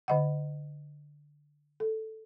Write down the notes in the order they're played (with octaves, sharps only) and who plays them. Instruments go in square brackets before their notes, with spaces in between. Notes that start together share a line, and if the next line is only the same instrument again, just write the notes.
[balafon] D3 D#5 F#5
A4